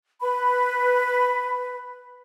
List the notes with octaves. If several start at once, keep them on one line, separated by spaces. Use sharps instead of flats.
B4 B5